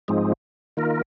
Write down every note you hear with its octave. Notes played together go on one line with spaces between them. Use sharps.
G#2 F3 G#3 C4 D#4
D#3 A#3 F4 A#4